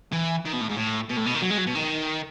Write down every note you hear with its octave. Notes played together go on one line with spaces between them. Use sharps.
E3
D#3
B2
A2
G#2
A2
B2
A2
B2
D#3
F#3
G#3
F#3
B2
D#3